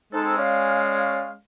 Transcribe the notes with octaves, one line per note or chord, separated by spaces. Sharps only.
G#3 C4 D#4 A4
C#4 D5 F5